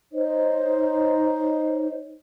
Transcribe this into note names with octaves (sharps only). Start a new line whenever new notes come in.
D#4 C5 C#5 D#5